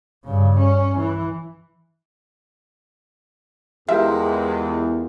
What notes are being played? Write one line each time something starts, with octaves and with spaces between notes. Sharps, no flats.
G2 C#3
C#4
E3
E2 G#3 F4 G4 A#4 E5